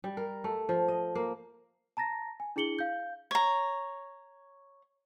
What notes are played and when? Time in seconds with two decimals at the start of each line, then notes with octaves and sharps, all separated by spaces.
0.04 G3
0.17 A#4
0.44 A3
0.69 F3
0.88 D#5
1.15 A#3
1.97 A5 A#5 A6 A#6
2.40 G#5
2.56 D4 E4 G#4 C#7 F#7 G7
2.79 F5 G6
3.31 C#5 A#5